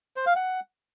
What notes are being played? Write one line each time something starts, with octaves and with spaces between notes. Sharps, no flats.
C5
F5
F#5